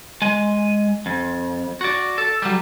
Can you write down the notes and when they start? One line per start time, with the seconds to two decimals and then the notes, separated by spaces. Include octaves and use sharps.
0.22 G#3 G#5
1.06 F2
1.81 F#4 D5
2.18 A4
2.42 F#3 G3